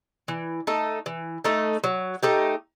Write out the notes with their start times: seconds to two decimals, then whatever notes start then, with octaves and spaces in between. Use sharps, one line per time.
0.28 E3
0.67 A3 D#4 A4
1.06 E3
1.44 A3 D#4 A4
1.84 F#3
2.23 A3 D#4 G4